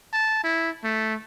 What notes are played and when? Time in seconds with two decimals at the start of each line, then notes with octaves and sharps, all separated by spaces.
0.13 A5
0.44 E4
0.84 A3